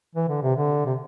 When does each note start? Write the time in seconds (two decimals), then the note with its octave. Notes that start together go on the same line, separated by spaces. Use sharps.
0.15 E3
0.28 D3
0.42 C3
0.55 D3
0.86 C3